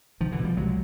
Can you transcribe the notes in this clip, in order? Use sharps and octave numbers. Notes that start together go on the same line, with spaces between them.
C2 D#3 F3
D3 E3
B2
F3 G3
C2 F#3 G#3